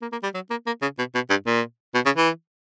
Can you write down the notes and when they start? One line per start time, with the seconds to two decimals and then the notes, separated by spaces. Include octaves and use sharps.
0.02 A#3
0.12 A#3
0.23 G3
0.34 F#3
0.50 A#3
0.66 A#3
0.82 C#3
0.98 B2
1.15 B2
1.30 G2
1.46 A#2
1.95 B2
2.05 C#3
2.16 E3